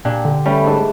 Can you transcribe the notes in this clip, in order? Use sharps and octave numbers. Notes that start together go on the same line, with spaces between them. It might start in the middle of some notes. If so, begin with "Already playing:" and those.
A#2 D4 G4
D3
G3 A3 C#4 A4 B4
G#2 D4 E5